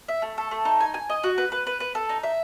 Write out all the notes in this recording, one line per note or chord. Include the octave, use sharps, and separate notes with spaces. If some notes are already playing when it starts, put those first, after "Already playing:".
E5
A3
A4
A3
D#4
G#5
G#5
D#5
F#4
B4
B4
B4
B4
A4
D#4
E5